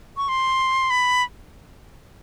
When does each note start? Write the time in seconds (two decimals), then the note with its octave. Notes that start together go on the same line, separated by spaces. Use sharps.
0.17 C#6
0.29 C6
0.90 B5